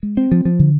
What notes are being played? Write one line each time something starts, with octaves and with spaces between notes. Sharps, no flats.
G#3
C4
F3
F3
D3